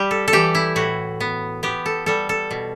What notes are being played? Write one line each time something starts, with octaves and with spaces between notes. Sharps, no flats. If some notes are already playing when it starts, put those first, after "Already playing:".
Already playing: G3 G4
A4
A4
E3 G4
E4
A2 F#4
B3
B3 G4
A4
G3 A4
A4
B2